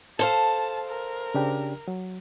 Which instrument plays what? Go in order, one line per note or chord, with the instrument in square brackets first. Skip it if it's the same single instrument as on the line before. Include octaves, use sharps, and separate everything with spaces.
[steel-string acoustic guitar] A4 C5 F5 [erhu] A5
[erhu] A#4
[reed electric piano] C#3 D4 G4
F#3